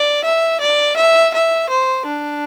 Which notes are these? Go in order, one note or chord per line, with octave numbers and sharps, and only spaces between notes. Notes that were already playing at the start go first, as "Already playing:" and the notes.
Already playing: D5
E5
D5
E5
E5
C5
D4